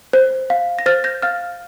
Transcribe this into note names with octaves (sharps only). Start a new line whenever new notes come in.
C5
F5
A#6
C5 F6 A6
G6 A#6
F5 F6 A6